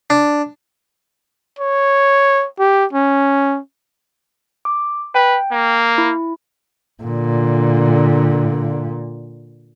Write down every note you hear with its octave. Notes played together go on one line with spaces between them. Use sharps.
D4
C#5
G4
C#4
D6
B4 G5
A#3
E4
A#2 D3